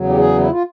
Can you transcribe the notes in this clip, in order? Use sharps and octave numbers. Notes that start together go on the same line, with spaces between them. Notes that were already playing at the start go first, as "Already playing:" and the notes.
Already playing: E2 C#3 F#3
G4
G#4
E4
F4